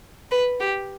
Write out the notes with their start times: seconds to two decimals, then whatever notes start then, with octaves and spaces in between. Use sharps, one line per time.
0.31 B4
0.60 G4